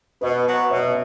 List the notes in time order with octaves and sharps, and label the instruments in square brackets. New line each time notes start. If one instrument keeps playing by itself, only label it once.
[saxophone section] B2 [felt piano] B4 D#5
[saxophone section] F#3 B3 F#4
[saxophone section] B2 [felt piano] C#5 E5